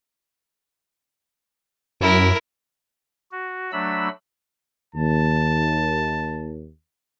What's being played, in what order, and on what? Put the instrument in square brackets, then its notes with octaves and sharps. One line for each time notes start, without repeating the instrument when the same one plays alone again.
[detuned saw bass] F#2 [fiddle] E4 A#4
[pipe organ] F#4
F#3 A3 D4 B5 E6
[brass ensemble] D#2 [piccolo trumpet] A5